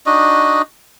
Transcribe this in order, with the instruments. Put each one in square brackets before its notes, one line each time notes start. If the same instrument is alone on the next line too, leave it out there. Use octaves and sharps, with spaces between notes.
[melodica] D4 D#4 F#4 D#5